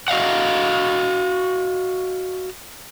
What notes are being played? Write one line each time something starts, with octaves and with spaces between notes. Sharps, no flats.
F#4 D#5 F5 F#5